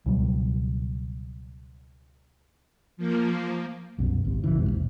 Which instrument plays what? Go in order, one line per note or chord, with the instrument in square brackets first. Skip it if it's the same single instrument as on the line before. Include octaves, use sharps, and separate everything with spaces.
[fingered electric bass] C#2 B2 F#3 G3
[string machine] F3 A#3
[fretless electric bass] C2 F#2 B2
G#1 C3
A#1 C#3 E3 F3
A#1 F2 G#2 C3
E1 A#1